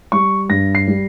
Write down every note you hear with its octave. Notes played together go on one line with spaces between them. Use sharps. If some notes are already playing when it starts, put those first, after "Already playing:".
G3 C#6
G2 A#6
C7
G3